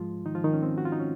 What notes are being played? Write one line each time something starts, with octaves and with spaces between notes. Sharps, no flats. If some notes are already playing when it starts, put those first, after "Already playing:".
Already playing: G#2 F3 G#3 F4
D#3 D#4
F3 F4
D#3 D#4
C#4
C4
F#4
F4
D#4
C#4